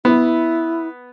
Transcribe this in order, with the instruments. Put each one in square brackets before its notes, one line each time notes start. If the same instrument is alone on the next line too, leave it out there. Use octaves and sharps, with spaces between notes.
[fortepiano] B3 [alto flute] E4